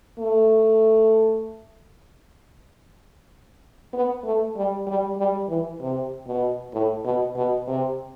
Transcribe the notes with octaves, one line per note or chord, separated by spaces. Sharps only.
A3
B3
A3
G3
G3
G3
E3
C3
B2
A2
B2
B2
C3